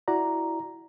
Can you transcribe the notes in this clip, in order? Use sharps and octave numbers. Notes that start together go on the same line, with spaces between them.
E4 F#4 D5 A#5